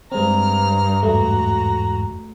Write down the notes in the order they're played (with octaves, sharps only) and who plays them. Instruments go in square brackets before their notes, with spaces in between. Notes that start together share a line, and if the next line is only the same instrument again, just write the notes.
[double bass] G2 [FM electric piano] G#3 C4 [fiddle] A#5 F6
[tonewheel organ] E2 G#2 [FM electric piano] A3 [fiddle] F#4 A#5